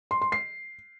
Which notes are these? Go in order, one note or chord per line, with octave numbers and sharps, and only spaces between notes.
C6
C6
C7